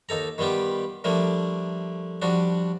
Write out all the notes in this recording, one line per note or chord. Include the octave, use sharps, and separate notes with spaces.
D#2 D#4 A4 A#5
D#3 G3 B3 F4 G4
F3 G3 A3 A#3 D4
F3 G3 D4 F#4